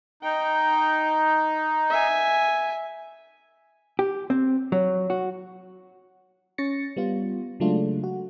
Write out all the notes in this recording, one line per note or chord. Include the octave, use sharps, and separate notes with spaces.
D#4 G5
E5 G#5
G4
C4
F#3
F#4
C#4 C#5 A6 A#6 C#7
G3 B3 F4
C#3 F#3 G#3 A3 D4 F4
F#4